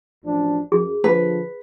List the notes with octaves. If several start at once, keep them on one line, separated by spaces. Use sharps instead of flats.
A1 F3 D4
F#2 G#4
D3 F3 B4